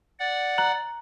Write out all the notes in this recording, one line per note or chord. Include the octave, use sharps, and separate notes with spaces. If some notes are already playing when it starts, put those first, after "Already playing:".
D5 F#5
A#5 F#6 F#7